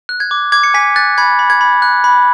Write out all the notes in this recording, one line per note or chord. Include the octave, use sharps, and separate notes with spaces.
F#6
G#6
D6
D6 G#6
C#7
G#5 B6
F#6 A6
B5 G#6
B5
G#6
B5
F#6
B5